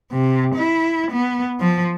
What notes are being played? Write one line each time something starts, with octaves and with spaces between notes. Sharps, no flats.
C3
E4
B3
F3